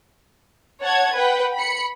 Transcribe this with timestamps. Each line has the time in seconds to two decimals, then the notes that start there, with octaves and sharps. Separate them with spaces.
0.83 C#5 F#5 A5 G#6
1.15 B4 F#5 G5
1.56 B5 C#7